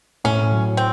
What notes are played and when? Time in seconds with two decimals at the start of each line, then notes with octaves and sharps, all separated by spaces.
0.24 A2 C#4
0.52 F#3
0.77 C4